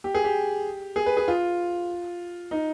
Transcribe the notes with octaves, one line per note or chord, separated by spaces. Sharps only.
G4
G#4
G4
G#4
B4
G#4
F4
D#4